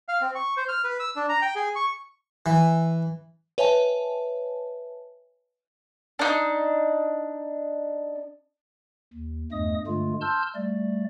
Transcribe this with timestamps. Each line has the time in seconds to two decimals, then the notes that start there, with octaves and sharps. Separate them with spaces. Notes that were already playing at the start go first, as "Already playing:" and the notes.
0.08 F5
0.21 C4
0.35 C#6
0.57 C5
0.68 F6
0.84 B4
1.00 E6
1.16 D4
1.29 A#5
1.42 G5
1.56 G#4
1.76 C#6
2.46 E3
3.58 B4 C#5 E5 G#5 A5
6.19 D4 D#4
9.13 D#2
9.52 E2 G2 A3 D#5 D#6
9.87 G2 D3 G#3 A3 F4
10.21 A5 C6 E6 F6 G6
10.55 G3 A3 D5